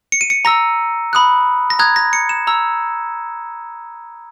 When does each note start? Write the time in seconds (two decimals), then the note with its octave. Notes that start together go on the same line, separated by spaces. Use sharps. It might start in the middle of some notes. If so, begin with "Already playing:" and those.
0.12 C#7
0.21 D#7
0.30 C#7
0.45 A#5 E6 A#6
1.13 B5 D#6 F#6
1.70 A#6
1.79 A#5 D#6 F#6 G#6
1.96 A#6
2.13 C#7
2.29 E7
2.47 A#5 E6